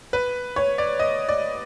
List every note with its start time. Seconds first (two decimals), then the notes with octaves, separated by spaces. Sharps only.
0.13 B4
0.56 C#5
0.78 D5
0.99 D#5
1.29 D5